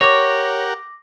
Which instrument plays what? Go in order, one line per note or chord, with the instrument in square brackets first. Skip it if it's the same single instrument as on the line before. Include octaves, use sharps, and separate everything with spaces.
[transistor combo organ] G4 A#4 F#5 [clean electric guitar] C#5 [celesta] D6 A#6